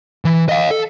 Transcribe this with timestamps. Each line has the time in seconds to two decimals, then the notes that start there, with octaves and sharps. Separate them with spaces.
0.25 E3
0.49 D#5 F5
0.71 A4